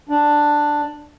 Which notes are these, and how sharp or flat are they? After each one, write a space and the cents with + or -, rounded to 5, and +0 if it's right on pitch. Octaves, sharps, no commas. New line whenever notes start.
D4 +5